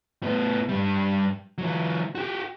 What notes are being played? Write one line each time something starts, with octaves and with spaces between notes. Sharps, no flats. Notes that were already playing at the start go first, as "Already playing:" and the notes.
A2 B3
G2 G3
E3 F#3
F#4 G4